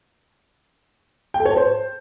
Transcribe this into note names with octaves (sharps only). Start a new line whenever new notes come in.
G5
A4
C#5
A5
C5